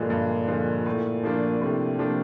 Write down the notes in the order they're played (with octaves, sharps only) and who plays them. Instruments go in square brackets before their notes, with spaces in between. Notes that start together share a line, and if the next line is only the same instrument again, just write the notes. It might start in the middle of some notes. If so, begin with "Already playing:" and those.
Already playing: [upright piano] G2 D3 F3 G#3 [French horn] A#2
[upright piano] G2
D3 F3 G#3
A2
F3 A#3 D4
[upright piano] A2 [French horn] C3
[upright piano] F3 A#3 D4